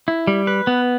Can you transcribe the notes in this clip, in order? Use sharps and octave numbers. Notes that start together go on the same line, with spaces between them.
E4
G3
B4
B3